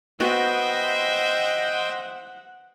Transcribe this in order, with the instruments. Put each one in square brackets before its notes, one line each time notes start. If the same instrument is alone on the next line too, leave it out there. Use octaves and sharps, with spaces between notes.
[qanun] B3 F#4 [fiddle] C5 E5 [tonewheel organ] D#5 G5 [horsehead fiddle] F#5